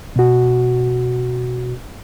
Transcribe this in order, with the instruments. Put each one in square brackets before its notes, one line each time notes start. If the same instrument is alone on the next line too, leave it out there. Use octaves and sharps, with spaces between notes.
[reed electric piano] B2 F#4